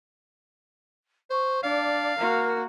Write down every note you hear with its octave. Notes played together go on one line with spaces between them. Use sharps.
C5 C#6
D4 D5 F5
A#3 F#4 A#4